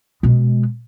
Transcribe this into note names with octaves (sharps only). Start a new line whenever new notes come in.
B2 G#3